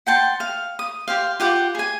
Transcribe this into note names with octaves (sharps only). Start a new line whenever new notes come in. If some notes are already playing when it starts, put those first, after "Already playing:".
F#5 G5 A5 C6
F5
D#6
G4 C5 F5
F4 G4 F#5 D6
G#4 G#5